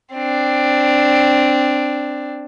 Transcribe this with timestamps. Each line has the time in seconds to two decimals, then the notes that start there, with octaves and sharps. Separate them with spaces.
0.14 C4 D4